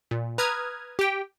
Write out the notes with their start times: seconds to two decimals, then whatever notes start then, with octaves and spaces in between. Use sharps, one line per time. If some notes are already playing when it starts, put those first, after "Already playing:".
0.11 A#2
0.38 B4 A#5 D#6 F6 G#6
0.99 G4 G5